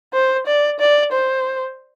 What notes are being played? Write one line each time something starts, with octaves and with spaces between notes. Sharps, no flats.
C5
D5
D5
C5